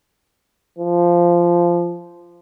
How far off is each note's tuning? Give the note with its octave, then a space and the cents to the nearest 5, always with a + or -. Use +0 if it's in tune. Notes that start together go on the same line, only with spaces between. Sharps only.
F3 -10